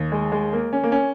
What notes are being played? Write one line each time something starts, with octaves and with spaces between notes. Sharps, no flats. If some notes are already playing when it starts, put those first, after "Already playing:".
Already playing: D#2 D#3
G#3
G#3
A#3
C#4
A#3
C#4